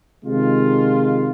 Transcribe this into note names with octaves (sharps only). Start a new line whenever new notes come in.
C3 D#3 G#3 F4